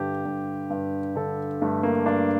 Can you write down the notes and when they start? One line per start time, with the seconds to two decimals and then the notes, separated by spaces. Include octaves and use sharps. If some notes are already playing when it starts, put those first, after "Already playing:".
Already playing: G2 D3 G4
0.25 G2
0.70 G2
1.16 D3 A4
1.62 G2 A3
1.83 A#3
2.06 G2 D4